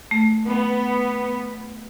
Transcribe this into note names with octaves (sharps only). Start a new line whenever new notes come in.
A3
B3